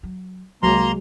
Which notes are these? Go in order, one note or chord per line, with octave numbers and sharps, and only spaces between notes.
F#3
C2 F#3 G#3 A#3 A#5 C6